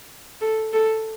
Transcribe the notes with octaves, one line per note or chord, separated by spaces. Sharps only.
A4
A4